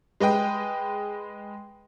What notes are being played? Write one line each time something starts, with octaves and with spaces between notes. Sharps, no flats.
G#3 B4 D#5 G5